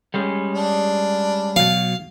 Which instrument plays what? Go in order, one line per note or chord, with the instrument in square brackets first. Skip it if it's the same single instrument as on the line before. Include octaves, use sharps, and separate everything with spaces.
[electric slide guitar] G3 G#3 C#4
[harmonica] D4
[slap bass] B2 F#3 [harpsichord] F5